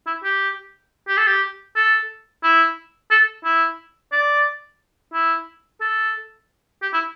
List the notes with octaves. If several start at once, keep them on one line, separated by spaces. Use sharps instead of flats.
E4
G4
G4
A4
G4
A4
E4
A4
E4
D5
E4
A4
G4
E4